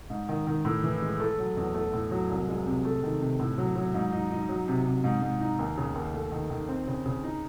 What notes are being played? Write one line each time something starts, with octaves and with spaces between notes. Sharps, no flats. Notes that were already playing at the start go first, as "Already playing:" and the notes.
G#2
D#3
D#3
A2
E3
G#3
A3
F#3
E2
A3
A2
F#3
C2
G#3
C3
A3
D#3
C3
A2
F#3
F#3
G#2
D#4
D#4
F#3
C3
C3
G#2
G#2
D#4
D#2
C#3
D#2
A3
D#3
D#3
C4
C#3
C#3
D#4